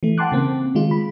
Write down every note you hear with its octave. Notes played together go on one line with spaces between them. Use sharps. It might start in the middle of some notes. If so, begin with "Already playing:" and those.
E3 A3
F#5 G5 A5 C6 D6 F#6
C#3 A#3 C4
D#3 G#3 F4
B5